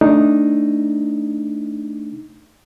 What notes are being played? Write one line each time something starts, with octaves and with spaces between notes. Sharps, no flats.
A3 D4 D#4